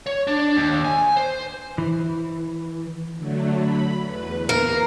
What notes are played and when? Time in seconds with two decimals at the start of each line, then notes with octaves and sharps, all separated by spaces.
0.07 C#5
0.27 D4
0.56 D#2
0.84 G#5
1.17 C5
1.78 E3
3.17 D3 F#3 A3
3.58 B5
4.05 E2 B4
4.49 A#3 A#4 C7